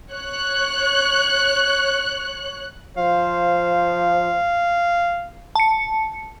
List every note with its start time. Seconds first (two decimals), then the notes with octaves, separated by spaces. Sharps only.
0.12 C#5 F#6
2.97 F3 C5 F5
5.55 A5 C#7